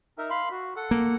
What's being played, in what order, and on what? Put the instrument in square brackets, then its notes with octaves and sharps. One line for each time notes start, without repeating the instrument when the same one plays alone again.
[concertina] D#4 A#4 E5
F5 B5 C6
F#4
A4 F#5
[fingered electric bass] A#3